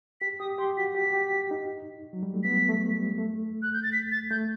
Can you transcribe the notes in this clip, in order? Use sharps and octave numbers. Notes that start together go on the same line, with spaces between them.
G4 B6
G4 D#6
G4 C6
F#4 B6
G4 B6
G4
D#4
F#3
G3
A3
B3 B6
A3
G3
A3
F#6
G6
A6
B6
A6
A3 G6